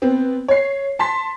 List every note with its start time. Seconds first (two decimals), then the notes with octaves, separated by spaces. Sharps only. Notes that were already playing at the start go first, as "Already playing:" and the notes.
0.02 B3 C4
0.48 C#5 C7
0.99 A5 C6 B6